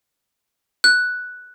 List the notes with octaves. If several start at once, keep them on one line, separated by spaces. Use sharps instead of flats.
F#6